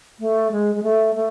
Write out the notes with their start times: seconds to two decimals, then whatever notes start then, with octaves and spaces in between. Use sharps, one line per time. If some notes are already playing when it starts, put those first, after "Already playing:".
0.20 A3
0.51 G#3
0.75 G#3
0.83 A3
1.15 A3